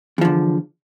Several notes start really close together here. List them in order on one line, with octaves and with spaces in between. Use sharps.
E2 F3 D3